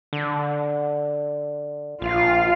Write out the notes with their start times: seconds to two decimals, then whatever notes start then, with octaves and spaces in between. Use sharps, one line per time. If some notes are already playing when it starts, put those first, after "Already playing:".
0.13 D3
2.02 A#1 F4 F5